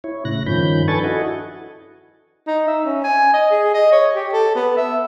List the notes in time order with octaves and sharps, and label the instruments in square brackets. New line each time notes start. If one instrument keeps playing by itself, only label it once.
[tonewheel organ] E4 C#5
A2 C#3 F#6 A#6
G2 D#3 F3 C#4 B5 G6
D4 A4 B4 G#5 C#6 A6
E4 F#4 A4 D#5 F#5 G#5
[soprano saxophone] D#4
E5
C#4
G#5
D#5
G#4
D#5
C#5
G4
A4
B3
E5